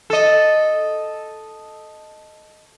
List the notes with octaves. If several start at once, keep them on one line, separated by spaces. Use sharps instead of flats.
A4 D#5